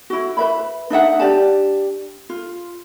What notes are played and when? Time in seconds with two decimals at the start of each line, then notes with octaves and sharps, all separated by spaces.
0.10 E4 F#4
0.37 B4 E5 B5
0.90 D4 D#4 E5 F#5
1.20 D4 G4 D5 A5
2.30 F4